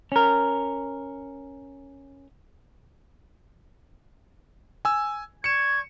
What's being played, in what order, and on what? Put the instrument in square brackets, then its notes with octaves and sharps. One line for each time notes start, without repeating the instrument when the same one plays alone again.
[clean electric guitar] C#4 A#4
[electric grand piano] G#5 E6
[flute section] D5 C#6 G#6 [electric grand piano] C#7 E7